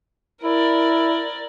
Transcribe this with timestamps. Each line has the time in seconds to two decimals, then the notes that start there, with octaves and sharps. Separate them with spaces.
0.44 E4 A#4 D5